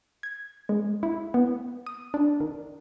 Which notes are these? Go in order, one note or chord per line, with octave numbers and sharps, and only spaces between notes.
G#6
G#3
E4
B3
D#6
D4
D#3